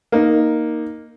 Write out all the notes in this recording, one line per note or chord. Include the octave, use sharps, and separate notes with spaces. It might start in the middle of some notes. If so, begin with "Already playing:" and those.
A#3 D#4